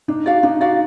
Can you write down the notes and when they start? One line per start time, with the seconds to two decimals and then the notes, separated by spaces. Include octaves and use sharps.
0.08 D4 D#4
0.26 F#4 D5 F5
0.43 D4 D#4
0.61 F#4 D5 F5